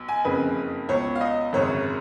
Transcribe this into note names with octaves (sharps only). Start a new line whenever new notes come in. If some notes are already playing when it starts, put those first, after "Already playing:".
Already playing: B1
G#5
F#1 F2 C#3 B4
C#2 B2 C#5
F5
D#5
G#1 F#2 C#3 C#5